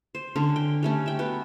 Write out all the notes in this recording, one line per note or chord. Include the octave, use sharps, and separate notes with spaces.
C5
D3 C#4
G5
G3 A3 C#4
E5 G5
B3 F#4